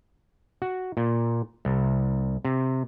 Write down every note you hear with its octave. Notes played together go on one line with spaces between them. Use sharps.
F#4
A#2
C2
C3